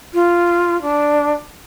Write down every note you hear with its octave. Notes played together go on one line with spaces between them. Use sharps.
F4
D4